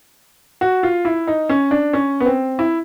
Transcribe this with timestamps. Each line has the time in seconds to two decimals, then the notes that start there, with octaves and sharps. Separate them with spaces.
0.61 F#4
0.83 F4
1.05 E4
1.27 D#4
1.49 C#4
1.71 D4
1.93 C#4
2.20 B3
2.26 C4
2.59 E4